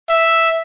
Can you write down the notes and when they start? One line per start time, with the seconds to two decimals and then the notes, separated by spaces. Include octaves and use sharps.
0.09 E5